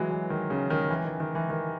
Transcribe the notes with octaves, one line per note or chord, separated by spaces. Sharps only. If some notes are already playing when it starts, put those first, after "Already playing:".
Already playing: E3 F#3 G#3
E3
D#3
C#3
D#3
E3
D#3
D#3
E3
D#3